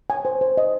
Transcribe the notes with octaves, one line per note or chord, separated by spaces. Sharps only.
G#5
C5
C5
D#5